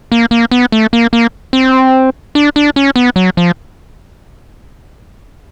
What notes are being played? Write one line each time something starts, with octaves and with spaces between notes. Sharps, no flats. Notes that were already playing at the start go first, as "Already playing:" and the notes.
A#3
A#3
B3
A3
A#3
A#3
C4
D4
D4
C#4
B3
F#3
F3